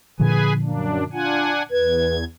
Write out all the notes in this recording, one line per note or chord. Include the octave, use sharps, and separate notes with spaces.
A#2 D3 F3 G#4 B4 G#5
F#2 A#3 D4
D4 F4 F#5 G#5
E2 B4 G#6